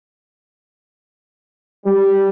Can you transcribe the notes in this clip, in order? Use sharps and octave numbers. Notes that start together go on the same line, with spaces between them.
G3